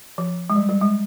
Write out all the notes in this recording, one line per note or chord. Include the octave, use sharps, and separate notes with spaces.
F3
G#3
G3
G3
G#3